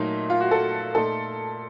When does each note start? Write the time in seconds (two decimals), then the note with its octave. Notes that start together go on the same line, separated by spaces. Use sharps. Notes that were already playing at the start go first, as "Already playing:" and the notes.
Already playing: A#2 F#3 A3 D#4
0.30 F4
0.40 F#4
0.51 A4
0.94 A#2 A3 D#4 A4